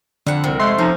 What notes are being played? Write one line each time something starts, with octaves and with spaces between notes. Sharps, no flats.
F2 D3 F#5
C2 C3 C4 A#4
G#3 A3 C6
F3 C#4 D#4